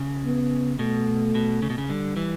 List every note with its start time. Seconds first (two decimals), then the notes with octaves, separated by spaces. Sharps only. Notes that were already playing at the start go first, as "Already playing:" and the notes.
Already playing: C#3
0.25 B3
0.79 B2 A3
1.35 B2
1.62 C#3
1.70 B2
1.78 C#3
1.89 D3 G3
2.17 E3